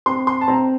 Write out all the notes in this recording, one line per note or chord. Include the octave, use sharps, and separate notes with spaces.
C4 C6
C6
A5
C4 A#5